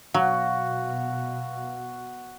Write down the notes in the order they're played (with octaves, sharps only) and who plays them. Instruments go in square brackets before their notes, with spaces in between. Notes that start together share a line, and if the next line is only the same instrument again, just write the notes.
[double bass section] B2 [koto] F#3 [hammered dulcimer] F#4 [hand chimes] F5